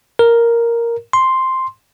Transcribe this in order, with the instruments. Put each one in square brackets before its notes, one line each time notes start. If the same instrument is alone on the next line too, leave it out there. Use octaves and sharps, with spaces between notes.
[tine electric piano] A#4
C6